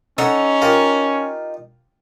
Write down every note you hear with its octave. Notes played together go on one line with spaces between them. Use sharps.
C#4 D#4 A4 F#5
F4 G4 A#4